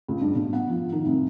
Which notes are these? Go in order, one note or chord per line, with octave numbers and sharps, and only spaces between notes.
C#2
G2
B2
F#5
F3
D#3
C2